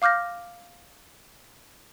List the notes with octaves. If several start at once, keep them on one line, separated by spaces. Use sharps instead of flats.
F5 D6 F6 G6 A#6